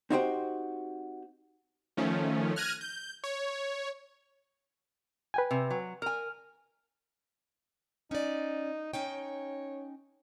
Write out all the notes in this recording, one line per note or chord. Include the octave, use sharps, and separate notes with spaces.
C4 D#4 F#4 G4 C5 G5
D#3 F3 A3 C#4
F6 F#6 G#6 A#6 D#7
G6
C#5
B4 G5 G#5
C3
F#3
A#4 G#5 F6
C#4 D#4 D5
C#4 D#4 C#5 G5